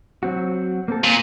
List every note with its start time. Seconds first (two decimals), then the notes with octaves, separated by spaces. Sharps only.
0.23 F#3 C4 F#4
0.88 A#3 C4 A4
1.04 A#2